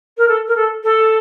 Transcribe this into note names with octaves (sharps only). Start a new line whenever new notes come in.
A#4
A4
A#4
A4
A4